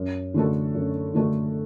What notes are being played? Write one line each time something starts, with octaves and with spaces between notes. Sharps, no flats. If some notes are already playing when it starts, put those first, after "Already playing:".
Already playing: F#2
D3 A3 F#4 A4
F#2
D3 A3 F#4 A4